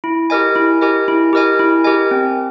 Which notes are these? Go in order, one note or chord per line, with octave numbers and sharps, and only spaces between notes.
E4
G4 A#4 D#5 G#5
E4
G4 A#4 D#5 G#5
E4
G4 A#4 D#5 G#5
E4
G4 A#4 D#5 G#5
C4